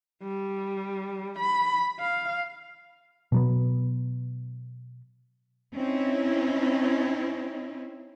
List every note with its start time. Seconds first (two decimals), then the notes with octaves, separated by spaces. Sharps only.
0.23 G3
1.39 B5
2.00 F5
3.32 B2 F#3 B3
5.73 C4 C#4 D#4 E4